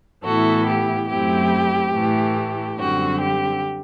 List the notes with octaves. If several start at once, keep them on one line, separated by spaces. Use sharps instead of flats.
A2 E3 B3 E4 F#4 A4
G4
F#2 F#3 A3 C4 E4 G4
A2 E3 A3
F#2 D3 G3 C4 F#4
G4